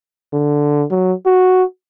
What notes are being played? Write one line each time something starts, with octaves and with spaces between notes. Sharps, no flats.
D3
F#3
F#4